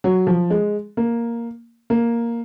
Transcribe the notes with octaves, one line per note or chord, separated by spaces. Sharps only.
F#3
F3
G#3
A#3
A#3